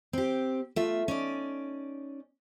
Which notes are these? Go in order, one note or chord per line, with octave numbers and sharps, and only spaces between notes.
C4 G4
A3 F4 E5
C#4 D#4 D5